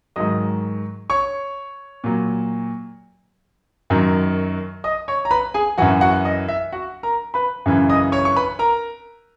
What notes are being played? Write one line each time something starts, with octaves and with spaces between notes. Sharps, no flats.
G#2 D#3 F#3 D#5 D#6
C#5 C#6
A#2 F#3
F#2 D#3 F#3
D#5 D#6
C#5 C#6
A#5
B4 B5
G#4 G#5
F#2 E3 F#4 F#5
F#4 F#5
D#5
E5
F#4 F#5
A#4 A#5
B4 B5
F#2 C#3 E3
D#5 D#6
C#5 C#6
C#6
B4 B5
A#4 A#5